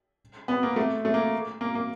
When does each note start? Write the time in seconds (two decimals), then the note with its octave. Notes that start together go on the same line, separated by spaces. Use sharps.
0.48 B3
0.63 A#3
0.76 A3
1.05 A3
1.14 A#3
1.61 A#3
1.75 A#3